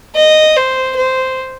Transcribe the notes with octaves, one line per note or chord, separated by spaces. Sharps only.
D#5
C5
C5